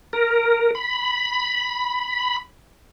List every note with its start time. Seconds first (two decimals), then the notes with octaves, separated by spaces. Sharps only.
0.13 A#4
0.75 B5